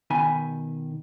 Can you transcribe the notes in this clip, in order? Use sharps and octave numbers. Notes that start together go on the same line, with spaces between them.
B2 D#3 G#5 B5